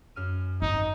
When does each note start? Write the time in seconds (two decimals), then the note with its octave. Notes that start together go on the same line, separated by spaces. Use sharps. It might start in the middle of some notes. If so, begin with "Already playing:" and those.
0.16 F#2 F6 D#7
0.62 G#1 D#4